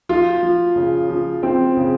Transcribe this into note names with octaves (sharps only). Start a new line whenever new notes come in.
F3 F4
F3
C#3
F3
F3 C4
C#3